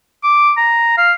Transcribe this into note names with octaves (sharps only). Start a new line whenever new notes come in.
D6
A#5
F5